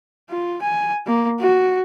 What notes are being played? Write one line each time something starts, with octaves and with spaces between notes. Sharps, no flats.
F4
G#5
A#3
F#4